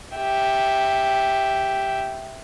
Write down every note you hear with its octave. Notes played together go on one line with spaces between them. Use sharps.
G4 E5